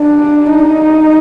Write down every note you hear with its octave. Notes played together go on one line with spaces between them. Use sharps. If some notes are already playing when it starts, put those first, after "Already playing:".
Already playing: D4
D#4